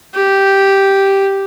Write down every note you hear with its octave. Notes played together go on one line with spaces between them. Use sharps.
G4